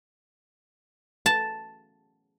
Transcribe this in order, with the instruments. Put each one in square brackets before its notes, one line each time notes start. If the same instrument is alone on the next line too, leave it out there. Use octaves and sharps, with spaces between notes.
[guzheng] A5